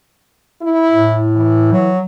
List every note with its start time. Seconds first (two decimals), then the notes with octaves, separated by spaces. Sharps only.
0.62 E4
0.92 A2
1.36 E3
1.72 F#3